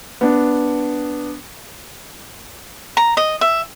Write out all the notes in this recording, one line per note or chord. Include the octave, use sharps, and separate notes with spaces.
B3 D4
A#5
D#5
E5